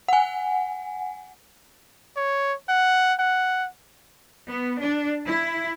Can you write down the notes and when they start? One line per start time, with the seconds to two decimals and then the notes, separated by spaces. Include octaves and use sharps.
0.08 F#5 G#5
2.17 C#5
2.69 F#5
3.19 F#5
4.49 B3
4.81 D4
5.27 E4